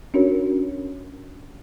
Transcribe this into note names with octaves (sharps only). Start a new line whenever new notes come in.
C#4 D4 F#4 A#4 C#5